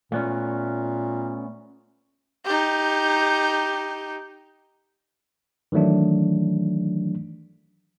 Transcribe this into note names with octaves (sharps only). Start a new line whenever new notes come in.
A#2 A3 B3 C#4
D#4 G4
D#3 E3 F#3 A3 D4